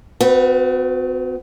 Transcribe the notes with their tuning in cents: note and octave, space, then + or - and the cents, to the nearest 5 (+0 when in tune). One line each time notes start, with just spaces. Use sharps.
C4 -45 F#4 -20 B4 +0